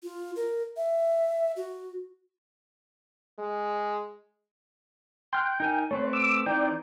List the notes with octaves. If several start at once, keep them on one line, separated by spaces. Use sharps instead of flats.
F4
A#4
E5
F#4
G#3
G5 C6 F6 F#6
D#4 A#4 G#5
A3 C4 B4 C#5
D6 E6
E3 C4 D#4 D5 G5